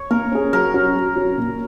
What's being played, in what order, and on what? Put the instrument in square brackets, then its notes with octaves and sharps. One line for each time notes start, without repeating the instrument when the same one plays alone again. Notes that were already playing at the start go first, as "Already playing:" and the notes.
Already playing: [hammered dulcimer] C#5
[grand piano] A#3 [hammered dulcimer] A#4
[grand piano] C#4 G#4
[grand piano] F#3 [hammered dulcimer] A#4
[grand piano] C#4 F#4
F#3
C#4 F#4
A#2